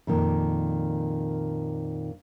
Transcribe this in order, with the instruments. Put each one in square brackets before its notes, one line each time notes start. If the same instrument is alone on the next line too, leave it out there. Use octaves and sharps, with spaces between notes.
[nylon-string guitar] F2 A#2 D#3